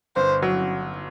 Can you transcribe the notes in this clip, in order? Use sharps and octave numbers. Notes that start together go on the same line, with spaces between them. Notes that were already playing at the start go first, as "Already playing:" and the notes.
G1 C5
F#3